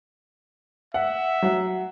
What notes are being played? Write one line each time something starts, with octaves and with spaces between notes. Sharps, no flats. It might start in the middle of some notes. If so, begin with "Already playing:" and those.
E5 F#5
F#3 F#5